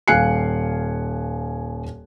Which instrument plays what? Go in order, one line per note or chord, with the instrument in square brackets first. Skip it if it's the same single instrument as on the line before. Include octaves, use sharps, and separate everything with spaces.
[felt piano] D#1 F5 G#5 F#6 C7 C#7